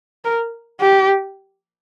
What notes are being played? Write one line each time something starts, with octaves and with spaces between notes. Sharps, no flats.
A#4
G4